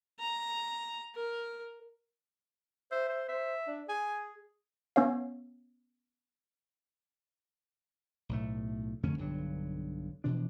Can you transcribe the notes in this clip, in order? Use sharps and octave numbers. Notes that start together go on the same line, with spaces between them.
A#5
A#4
C5 E5
C5
C5 E5
D4
G#4 G#5
B3 C#4 C#5 F5
B1 A2 A3
F2 D3 A3 C#4
B1 G2 D3 F#3
B2 E3 F3 D4